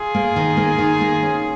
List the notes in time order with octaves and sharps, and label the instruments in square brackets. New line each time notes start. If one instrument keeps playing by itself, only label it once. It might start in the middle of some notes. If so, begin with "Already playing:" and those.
Already playing: [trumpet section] F4 G#4
[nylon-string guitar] A#3
D#3
A#3
D#3
A#3
C#4